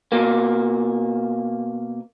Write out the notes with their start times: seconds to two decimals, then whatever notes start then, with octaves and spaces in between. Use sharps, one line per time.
0.12 B2 A#3